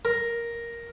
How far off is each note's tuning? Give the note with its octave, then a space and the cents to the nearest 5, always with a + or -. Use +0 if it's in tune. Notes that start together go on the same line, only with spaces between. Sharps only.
A#4 +5